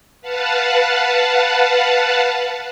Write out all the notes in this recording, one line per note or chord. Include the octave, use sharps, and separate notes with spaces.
B4 F5 F#5 A5